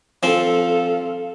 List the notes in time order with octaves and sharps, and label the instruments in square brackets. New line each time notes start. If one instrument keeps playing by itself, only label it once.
[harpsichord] F3 C4 [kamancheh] A4 F5